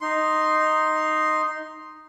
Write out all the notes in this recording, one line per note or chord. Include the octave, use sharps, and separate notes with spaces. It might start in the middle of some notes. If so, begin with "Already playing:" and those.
D#4 C6